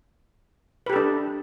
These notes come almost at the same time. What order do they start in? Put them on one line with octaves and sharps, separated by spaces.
B4 G4 A4 D4